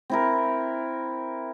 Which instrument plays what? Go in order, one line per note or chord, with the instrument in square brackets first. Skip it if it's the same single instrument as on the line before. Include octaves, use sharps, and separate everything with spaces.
[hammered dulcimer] C4 E4 A#4